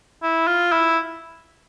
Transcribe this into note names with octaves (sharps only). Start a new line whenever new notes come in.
E4
F4
E4